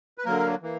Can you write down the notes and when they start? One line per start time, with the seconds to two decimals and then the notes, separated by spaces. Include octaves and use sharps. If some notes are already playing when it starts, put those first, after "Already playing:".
0.18 B4
0.25 D3 F#3 A#3 A#4
0.62 E3 A#3